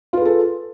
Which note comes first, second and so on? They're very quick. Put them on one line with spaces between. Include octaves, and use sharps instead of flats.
F4 B4 G#4 A4